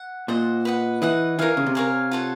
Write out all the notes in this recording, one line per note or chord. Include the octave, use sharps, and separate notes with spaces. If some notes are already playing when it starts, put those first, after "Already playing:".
Already playing: F#5
A#2 C5 D#5 F#5
B4 D#5 F#5
E3 B4 D#5 F#5
E3 A#4 C#5 F5 G#5
C#3
C3
A#4 C#5 F5 G#5
F4 A4 C#5 F#5